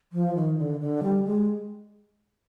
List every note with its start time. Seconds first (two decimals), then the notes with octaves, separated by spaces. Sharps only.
0.13 F3
0.35 D#3
0.58 D3
0.80 D3
1.03 G3
1.25 G#3